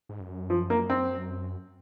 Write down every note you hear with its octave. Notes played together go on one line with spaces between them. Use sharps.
G#2
F#2
F3
A#3
C4